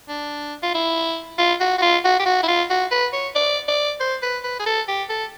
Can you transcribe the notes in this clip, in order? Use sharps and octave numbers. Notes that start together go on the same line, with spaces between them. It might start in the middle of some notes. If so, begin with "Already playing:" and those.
D4
F4
E4
F4
F#4
F#4
F4
F#4
G4
F#4
E4
F4
F#4
B4
C#5
D5
D5
C5
B4
B4
G#4
A4
G4
A4